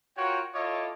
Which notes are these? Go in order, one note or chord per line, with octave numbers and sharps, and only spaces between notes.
F4 F#4 A#4 C#5 G5
E4 F4 A4 C#5 D#5 D6